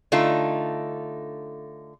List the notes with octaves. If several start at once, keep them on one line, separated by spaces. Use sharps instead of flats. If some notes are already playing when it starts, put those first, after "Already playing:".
D3 A3 D#4 F4